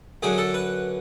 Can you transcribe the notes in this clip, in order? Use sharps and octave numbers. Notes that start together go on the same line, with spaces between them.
F#2 D3 F#3 G#4
A4
B4